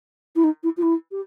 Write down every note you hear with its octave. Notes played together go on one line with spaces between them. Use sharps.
E4
D#4
E4
F4
E4
G4